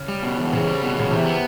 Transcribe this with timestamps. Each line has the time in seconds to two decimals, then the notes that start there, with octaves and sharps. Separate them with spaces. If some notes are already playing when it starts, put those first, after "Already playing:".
Already playing: C#3
0.08 G3
0.23 B2
0.38 E2
0.53 C#3 C4
0.67 G3
0.83 B2
0.96 E2 C#3
1.11 C3 E3
1.26 B3